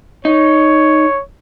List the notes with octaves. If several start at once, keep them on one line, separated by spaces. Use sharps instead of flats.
D#4 C#5